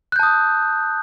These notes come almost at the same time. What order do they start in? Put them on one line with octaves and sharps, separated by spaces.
F#6 G6 A5 D#6